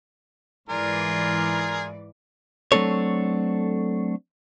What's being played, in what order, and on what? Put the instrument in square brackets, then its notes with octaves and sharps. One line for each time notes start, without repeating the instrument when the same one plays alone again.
[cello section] G#2 E3 D5 [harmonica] F4 G#4 A#4
[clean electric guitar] F#3 A3 C4 D4 A4 C#5